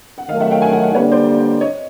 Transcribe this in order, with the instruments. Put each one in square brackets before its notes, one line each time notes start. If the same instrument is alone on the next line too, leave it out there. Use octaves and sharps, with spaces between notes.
[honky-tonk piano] F#5
[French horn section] D#3 F#3 A3 [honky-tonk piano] D#5 F5
[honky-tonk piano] E5 F#5
F5 G5
F#5 G#5
F#5 G#5
[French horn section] D3 G3 A#3 [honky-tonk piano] B4 C#5
[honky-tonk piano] C5 D5
C#5 D#5